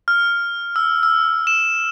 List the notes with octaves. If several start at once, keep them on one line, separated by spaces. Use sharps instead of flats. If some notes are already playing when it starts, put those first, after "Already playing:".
F6
E6
E6
E7